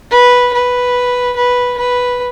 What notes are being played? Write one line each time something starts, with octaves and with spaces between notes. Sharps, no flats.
B4
B4
B4
B4